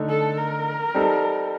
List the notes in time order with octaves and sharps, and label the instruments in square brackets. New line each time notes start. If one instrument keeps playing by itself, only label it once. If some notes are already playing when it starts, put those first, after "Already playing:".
Already playing: [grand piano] D3 A3 D#4
[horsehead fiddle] A4
A#4
[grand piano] G3 C4 D#4 A4